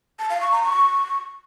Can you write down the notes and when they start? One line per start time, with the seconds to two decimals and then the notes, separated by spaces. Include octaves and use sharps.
0.19 A5
0.30 F5
0.41 C#6
0.52 A#5
0.63 C#6